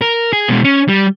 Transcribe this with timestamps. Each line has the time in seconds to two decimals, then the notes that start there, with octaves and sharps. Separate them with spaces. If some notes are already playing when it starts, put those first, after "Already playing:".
0.01 A#4
0.33 G#4
0.49 B2 G#3
0.64 C#4
0.88 G3